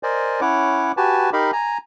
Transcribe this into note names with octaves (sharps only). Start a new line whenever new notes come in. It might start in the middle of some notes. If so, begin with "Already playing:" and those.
A#4 C5 D5 D#5 G#5
C#4 E4 C#5 F#5 D6
F#4 G4 B4 G#5 A5
D#4 G4 A#4 D#5 F5 B5
G#5 A#5